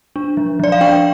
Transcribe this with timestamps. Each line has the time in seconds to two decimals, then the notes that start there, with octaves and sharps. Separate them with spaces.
0.16 D4
0.37 F3
0.60 F3 D5
0.72 F5
0.81 D4 G5